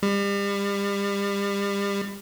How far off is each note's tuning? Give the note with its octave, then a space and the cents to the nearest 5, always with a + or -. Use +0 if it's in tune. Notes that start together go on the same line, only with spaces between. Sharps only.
G3 +35